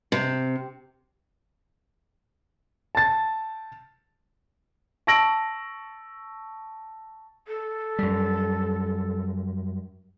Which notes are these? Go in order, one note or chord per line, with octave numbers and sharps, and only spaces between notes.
C3
A5 A6
A5 C#6 E6 A#6 D7 F#7
A4
F#2 G3